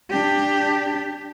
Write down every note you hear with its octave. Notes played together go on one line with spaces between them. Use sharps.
D4 G4